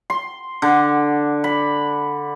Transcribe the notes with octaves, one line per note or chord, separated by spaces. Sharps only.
C6
D3
B5